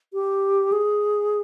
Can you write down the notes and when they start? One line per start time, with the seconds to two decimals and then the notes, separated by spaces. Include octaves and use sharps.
0.14 G4
0.72 G#4